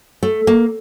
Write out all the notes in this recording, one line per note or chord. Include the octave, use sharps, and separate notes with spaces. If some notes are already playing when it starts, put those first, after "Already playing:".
A3
A#3